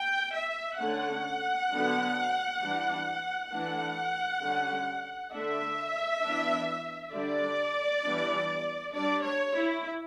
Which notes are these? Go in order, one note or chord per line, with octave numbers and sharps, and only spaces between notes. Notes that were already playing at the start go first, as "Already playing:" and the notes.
Already playing: G5
E5
D3 A3 C#4 F#5
D3 F#3 B3 D4
E3 G3 D4
E3 A3 D4 F#5
D3 G3 C#4
D3 A3 D4 E5
E3 B3 D4
D3 G3 D4 D5
E3 G3 B3 D4
G3 D4 D5
C#5
E4